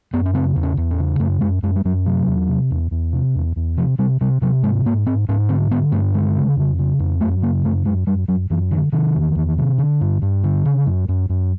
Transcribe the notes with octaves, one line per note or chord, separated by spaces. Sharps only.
F#2 B3
C#4
C#3 C4
E2
C#4
E2
C#4
C#3
F#2 A3
F#2 G#3
F#2 G#3
G3
F#2 F#3
C3 F#3
E2
C3
E2
E2
C3
E2
E2
C3 F3
C3 G3
C3 G3
C3 F#3
G#2 G#3
G#2 A#3
G#2 C4
G#2 C#4
D3 C4
D3 B3
G2 A3
D3 G#3
C#3
F2
C#3
F2
F#2 A3
C#3 A#3
F#2 A3
F#2 G#3
F#2 G3
F#2 F#3
F#2 E3
D3 D#3
C3 D#3
E2
E2
C3
D3
G2
G2
D3
C#3
F#2
F#2
F#2